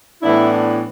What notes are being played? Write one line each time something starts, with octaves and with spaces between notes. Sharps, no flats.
A2 E3 B3 D4 E4